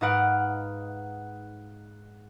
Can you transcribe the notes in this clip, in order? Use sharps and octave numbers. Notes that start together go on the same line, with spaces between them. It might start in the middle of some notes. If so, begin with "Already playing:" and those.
G#2 D#4 B4 F5 F#5 D7